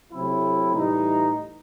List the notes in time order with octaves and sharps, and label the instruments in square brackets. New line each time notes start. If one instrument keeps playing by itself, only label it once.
[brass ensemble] C3 F#3 A3 C4 E4
A2 E3 G3 D#4